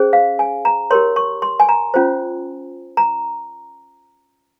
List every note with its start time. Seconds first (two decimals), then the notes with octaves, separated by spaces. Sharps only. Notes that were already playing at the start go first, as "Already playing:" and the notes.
Already playing: C#4 G#4 C5
0.13 F5
0.39 G#5
0.65 A#5
0.91 G4 A#4 C#5 C6
1.16 C#6
1.42 C6
1.60 G#5
1.69 A#5
1.94 C#4 F4 C5
2.97 A#5